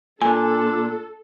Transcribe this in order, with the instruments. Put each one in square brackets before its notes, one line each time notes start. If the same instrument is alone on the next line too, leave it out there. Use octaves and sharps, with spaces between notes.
[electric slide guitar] A#2 [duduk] D4 [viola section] A4 [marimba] G#5